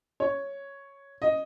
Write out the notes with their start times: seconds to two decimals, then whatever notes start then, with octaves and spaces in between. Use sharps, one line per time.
0.20 C#5
1.22 D#5